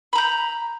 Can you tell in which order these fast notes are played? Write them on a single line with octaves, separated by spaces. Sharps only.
B5 A#5 G6